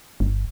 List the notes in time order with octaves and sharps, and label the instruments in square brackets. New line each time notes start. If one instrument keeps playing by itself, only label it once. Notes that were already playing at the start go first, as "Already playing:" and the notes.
[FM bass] G1